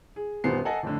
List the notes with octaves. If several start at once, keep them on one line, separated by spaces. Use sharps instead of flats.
G#4
D#1 F#2 G3 B3 C5 C7
A4 D#5 F#5 G#5
F2 A2 D3